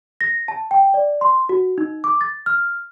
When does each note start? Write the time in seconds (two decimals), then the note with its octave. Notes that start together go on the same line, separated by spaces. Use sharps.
0.21 A#6
0.48 A5
0.71 G5
0.94 D5
1.21 C6
1.49 F#4
1.78 D#4
2.04 D6
2.21 A6
2.46 F6